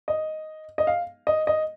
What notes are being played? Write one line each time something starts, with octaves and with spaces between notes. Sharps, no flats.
D#5
D#5
F5
D#5
D#5